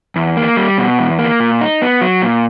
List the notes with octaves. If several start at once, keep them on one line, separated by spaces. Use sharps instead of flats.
E2
A#3
G3
B2
E2
A#3
A#2
D#4
B3
F#3
A#2